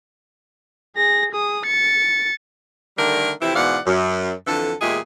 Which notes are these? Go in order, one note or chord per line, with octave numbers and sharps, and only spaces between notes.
G#4 A#6
G#4 D#6
A6 C#7
D3 D#3 G3 A3 D4 A#4
F2 C3 E3 C4 E4
G#2 B2 E3 D5 F5 F#5
F#2
F2 D3 E3 A4
E2 A#2 G#3 E4 G4 G#4